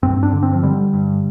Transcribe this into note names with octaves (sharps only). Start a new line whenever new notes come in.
G2 C4
D4
D3
C4
F3
D3 G3
G2